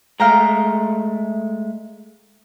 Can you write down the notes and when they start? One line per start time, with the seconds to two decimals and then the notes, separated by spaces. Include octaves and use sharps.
0.20 G#3 A3 F5 G5 A#5